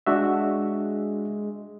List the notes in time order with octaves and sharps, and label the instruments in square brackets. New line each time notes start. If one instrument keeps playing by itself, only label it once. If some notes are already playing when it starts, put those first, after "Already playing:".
[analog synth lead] G#3 [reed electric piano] D4 F#4 E5